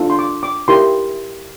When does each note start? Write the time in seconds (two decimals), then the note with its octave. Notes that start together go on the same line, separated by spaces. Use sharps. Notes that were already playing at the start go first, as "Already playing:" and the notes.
Already playing: D4 F4 A4 C5
0.10 C6
0.19 D6
0.43 D6
0.68 E4 G4 A#4 C6